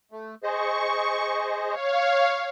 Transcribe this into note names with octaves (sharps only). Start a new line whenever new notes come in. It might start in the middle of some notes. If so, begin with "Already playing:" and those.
A3
G#4 C5 D#5 C#6
C#5 F5